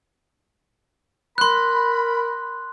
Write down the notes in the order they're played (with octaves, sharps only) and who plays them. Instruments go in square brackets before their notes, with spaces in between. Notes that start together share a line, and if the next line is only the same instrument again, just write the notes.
[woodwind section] A#4 B5 [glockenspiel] C6 F#6